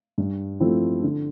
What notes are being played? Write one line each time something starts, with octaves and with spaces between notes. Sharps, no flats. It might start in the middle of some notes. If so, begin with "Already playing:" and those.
G2
F3 A3 C4 E4
D3